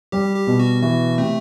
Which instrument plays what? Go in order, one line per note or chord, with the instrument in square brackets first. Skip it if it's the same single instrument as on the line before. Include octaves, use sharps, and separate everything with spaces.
[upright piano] G3 [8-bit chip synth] G4
[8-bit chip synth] G4
[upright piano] B2
[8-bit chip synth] F#4
[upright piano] E3 [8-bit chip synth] F#4
[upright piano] C3 [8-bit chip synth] A3